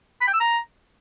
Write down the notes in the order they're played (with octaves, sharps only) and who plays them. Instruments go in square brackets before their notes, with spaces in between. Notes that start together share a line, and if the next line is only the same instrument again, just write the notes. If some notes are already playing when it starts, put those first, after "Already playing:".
[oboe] B5
G5
E6
A#5